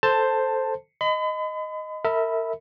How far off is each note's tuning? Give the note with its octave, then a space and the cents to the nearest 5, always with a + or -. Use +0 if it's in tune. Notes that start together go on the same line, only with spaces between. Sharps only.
A4 +0 C5 +0 A5 +10
D#5 +0 B5 +40
A#4 -35 E5 -20 B5 +0